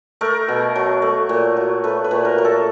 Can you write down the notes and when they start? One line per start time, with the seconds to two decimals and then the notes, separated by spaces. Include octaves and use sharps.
0.21 A3 A#4
0.48 B2
0.76 F#3
1.02 A3
1.29 A#2
1.57 F#3
1.84 A3 B4
2.04 B4
2.11 A#2
2.25 A#4
2.38 F#3
2.45 A4